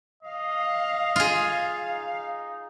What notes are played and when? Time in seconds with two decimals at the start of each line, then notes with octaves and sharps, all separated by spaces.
0.23 D#5 F5
1.16 F4 G#4
1.87 D#4